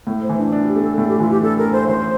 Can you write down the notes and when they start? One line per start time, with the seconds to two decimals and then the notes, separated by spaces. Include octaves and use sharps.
0.07 A2
0.22 C5
0.29 E3
0.38 D4
0.52 D4
0.62 F4
0.68 G4
0.75 A3
0.82 A4
0.97 A2 A4
1.08 G4
1.19 E3 F4
1.30 G4
1.43 D4 A4
1.57 A#4
1.65 A3
1.72 C5
1.87 A1 C5